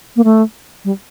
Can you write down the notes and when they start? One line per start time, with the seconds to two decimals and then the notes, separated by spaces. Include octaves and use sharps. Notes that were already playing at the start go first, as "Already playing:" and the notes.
0.16 A#3
0.24 A3
0.85 G3